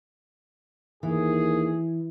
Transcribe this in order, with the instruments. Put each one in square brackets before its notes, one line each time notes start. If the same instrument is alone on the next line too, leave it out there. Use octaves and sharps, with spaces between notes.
[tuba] D#2 [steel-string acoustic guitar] E3 [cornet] G#4